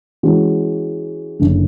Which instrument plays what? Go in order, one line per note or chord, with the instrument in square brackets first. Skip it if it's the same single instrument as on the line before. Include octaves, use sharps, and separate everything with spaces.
[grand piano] E3 G#3 C#4 F#4
F#1 F#2 D3